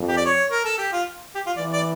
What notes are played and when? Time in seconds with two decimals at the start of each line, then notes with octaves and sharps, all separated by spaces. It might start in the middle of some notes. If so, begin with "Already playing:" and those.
Already playing: F2
0.09 G4
0.17 D5
0.26 C#5
0.51 A#4
0.65 A4
0.78 G4
0.92 F4
1.35 G4
1.46 F4
1.57 E3 D5
1.73 D5